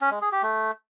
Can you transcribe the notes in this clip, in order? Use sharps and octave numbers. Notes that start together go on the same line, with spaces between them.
C#4
G#3
G#4
G4
A3